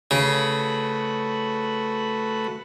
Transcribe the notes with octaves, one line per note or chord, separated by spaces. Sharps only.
C#3 A3 F#4 B4